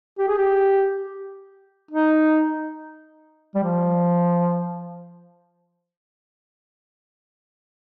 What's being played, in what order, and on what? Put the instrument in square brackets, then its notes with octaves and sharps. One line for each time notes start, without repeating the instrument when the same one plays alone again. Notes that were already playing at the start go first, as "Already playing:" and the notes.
[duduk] G4
G#4
G4
D#4
G3
F3